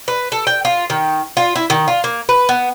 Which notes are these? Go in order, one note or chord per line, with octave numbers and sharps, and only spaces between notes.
B4
A4
G5
F4
D#3
F4
E4
D#3
F4
A#3
B4
B3